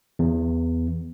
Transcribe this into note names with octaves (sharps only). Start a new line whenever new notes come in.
E2